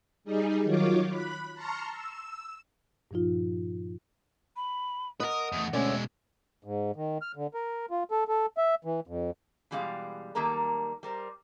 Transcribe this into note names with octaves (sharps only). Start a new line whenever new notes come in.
G3 D#4 G#4
D#3 F#3 F4 C#5 D6
B5 F#6
A5 A#5 C6 C#6 F6
E6
G2 A#2 F3 D#4 F4
B5
A#4 B4 D#5 F#5 D#6
E2 A3
D2 B2 G#3 C#4 D5 E5 G#5
G#2
D#3
F6
D3
A#4
F4
A4
A4
E5
E3
F2
B2 E3 G3 G#3 F5
D#3 F#3 G3 A#3 A4 A#4
G3 A#4 C5